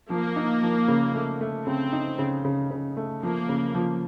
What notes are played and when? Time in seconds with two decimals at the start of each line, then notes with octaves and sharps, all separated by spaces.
0.10 F3 A#3
0.36 D#4
0.63 F3
0.88 C#3
1.14 A3
1.41 A3
1.66 C#3 C4
1.93 D#4
2.19 C#3
2.45 C#3
2.71 C#3
2.97 A3
3.23 F3 A#3
3.49 C#3
3.75 F3